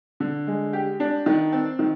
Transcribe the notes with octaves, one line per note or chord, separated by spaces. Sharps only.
D3
G#3
G4
D4
D#3
C4
D#3